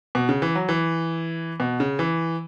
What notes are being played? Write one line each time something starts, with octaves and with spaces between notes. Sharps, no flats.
B2
C#3
E3
F#3
E3
B2
C#3
E3